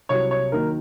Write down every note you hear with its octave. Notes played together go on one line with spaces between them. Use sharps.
C2 C3 F#3 C#5
C#5
D#2 D#3 F#3 A#4